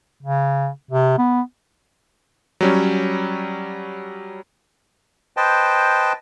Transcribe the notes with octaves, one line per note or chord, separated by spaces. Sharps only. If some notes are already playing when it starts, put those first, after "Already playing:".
C#3
C3
B3
F#3 G3 C#4
B4 C5 D#5 G5 A5